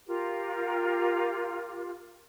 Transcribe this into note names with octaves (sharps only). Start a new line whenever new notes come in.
F4 G4 A#4